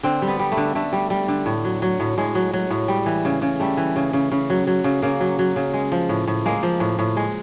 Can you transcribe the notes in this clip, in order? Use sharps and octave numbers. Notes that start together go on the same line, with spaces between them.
D3 C4
G3
B3
G3
A3
D3
D3 A3
G3
G3
D3
A2
F#3
F#3
A2
A2 G#3
F#3
F#3
A2
G3
E3
C#3
C#3
G3 A3
E3
C#3
C#3
C#3
F#3
F#3
C#3
C#3 A#3
F#3
F#3
C#3
G#3
F3
A2
A2
G#3 A#3
F3
A2
A2
G#3